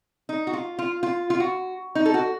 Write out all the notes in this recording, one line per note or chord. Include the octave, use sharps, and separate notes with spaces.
D#4
F#4
F4
F4
F4
F4
F#4
D#4
A4
F#4